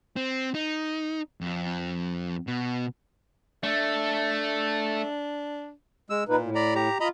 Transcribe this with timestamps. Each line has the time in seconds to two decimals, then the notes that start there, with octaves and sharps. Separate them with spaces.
0.16 C4
0.55 D#4
1.41 F2
2.47 B2
3.63 A3 D4
6.10 G#3 E6
6.29 A#2 D#4 B4
6.40 A2
6.55 D5 A#5 B5
6.75 G4 A#5
7.00 F4 D#5 A#5 B5